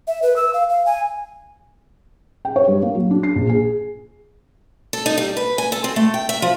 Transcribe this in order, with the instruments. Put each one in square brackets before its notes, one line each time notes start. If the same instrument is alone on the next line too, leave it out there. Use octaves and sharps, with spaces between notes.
[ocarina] E5
B4
E6
F5
F5
G#5
[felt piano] G5
C#5
G2
A#3
F#3
D4
C7
A#1
G#4
[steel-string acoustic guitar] A4
D#4
G3
B4
G#5
A4
C4
A3
G5
E5
F3